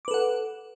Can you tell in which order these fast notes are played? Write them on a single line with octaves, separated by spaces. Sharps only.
D6 B4 A4 F#5